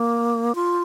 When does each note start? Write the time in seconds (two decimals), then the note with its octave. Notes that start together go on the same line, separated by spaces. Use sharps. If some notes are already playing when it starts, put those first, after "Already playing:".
Already playing: A#3
0.55 F4